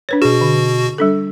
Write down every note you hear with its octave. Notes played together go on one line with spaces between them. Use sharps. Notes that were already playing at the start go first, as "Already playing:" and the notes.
D4 B4 C#5
B2 F#4 G#4
D3
G3 D4 A4